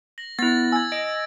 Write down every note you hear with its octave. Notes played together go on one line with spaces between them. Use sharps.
A#6 F#7
B3 E4 A6 A#6
G#5 E6 G#6
D#5 D7